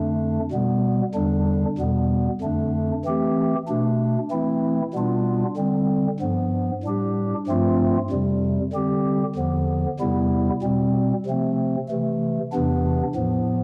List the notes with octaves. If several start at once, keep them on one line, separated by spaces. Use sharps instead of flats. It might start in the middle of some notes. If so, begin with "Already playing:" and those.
Already playing: F2 D3 A3 D4
B2 G3 B3
E2 D3 G3 D4
E2 B2 G3 B3
F2 D3 A3 D4
E3 A3 C4 G4
B2 A3 D4
E3 A3 C4 E4
B2 G3 B3 D4 F4
D3 G3 C4
G2 F3 B3
A2 G3 D4 G4
G2 F3 A3 C4 F4
F2 C3 G3
D3 G3 C4 G4
E2 D3 F3 B3
E2 C3 G3 B3 E4
B2 G3 C4
C3 F3 A3 C4
C3 E3 A3
E2 C3 E3 B3 D4
A2 F3 B3